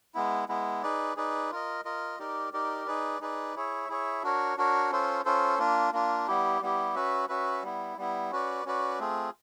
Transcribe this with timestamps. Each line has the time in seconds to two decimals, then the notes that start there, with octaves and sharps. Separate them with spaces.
0.15 G#3 B3 E4
0.49 G#3 B3 E4
0.83 D#4 G#4 B4 D5
1.17 D#4 G#4 B4 D5
1.51 F4 A#4 D#5
1.85 F4 A#4 D#5
2.19 D#4 G4 A#4 D5
2.53 D#4 G4 A#4 D5
2.87 D#4 G#4 B4 D5
3.21 D#4 G#4 B4 D5
3.55 E4 G#4 C#5 E5
3.89 E4 G#4 C#5 E5
4.23 D4 F#4 A#4 C#5
4.57 D4 F#4 A#4 C#5
4.91 C#4 F4 A4 C5
5.25 C#4 F4 A4 C5
5.59 A#3 D4 F4
5.93 A#3 D4 F4
6.27 G3 B3 E4 G4
6.61 G3 B3 E4 G4
6.95 C#4 F#4 B4 E5
7.29 C#4 F#4 B4 E5
7.63 G3 B3 E4
7.97 G3 B3 E4
8.32 C#4 F#4 B4 D5
8.65 C#4 F#4 B4 D5
8.99 A3 C4 F4 G#4